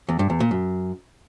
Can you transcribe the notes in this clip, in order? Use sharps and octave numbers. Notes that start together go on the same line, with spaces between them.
E2
G2
E2
A#2
F#2